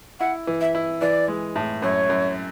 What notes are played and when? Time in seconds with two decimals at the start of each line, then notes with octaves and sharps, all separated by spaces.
0.20 E4 F#5
0.47 E3
0.61 E5
0.75 E4
1.01 E3 D5
1.28 G#3
1.56 A2
1.82 F#2 C#5
2.10 F#2